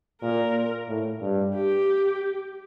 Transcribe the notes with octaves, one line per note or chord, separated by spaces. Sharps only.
A#2 A#4
A2
G2
G4